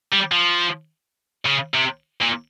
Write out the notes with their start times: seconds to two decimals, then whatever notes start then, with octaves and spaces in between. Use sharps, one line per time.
0.13 G3
0.32 F3
1.46 C#3
1.74 C3
2.21 A#2